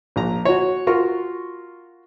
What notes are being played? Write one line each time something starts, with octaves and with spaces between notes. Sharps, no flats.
A#1 A#5
F#4 C#5
F4 F#4 A#4 C#6